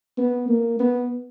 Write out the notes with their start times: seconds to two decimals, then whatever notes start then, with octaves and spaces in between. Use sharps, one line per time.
0.18 B3
0.49 A#3
0.79 B3